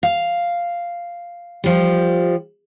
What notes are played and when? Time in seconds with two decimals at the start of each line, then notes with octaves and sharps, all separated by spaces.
0.03 F5
1.64 F3 G3